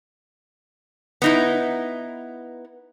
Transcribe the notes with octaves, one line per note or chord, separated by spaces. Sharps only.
B3 D#4 E4